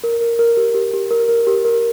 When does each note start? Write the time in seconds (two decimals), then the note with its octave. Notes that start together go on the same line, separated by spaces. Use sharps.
0.04 A#4
0.21 A#4
0.39 A#4
0.57 G4
0.75 G4
0.93 G4
1.11 A#4
1.28 A#4
1.47 G4
1.65 A#4